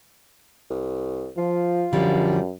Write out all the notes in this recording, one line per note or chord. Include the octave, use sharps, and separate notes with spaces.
C2
F3 F4
F#2 D3 F3 G3